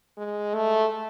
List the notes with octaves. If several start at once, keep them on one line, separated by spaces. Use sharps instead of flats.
G#3
A3